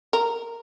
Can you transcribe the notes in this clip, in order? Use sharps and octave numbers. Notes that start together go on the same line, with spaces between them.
A#4